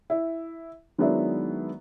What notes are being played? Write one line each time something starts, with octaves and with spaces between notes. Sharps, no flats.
E4
D#3 F#3 G#3 B3 D4 E4